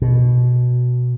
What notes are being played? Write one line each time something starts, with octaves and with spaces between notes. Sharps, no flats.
B2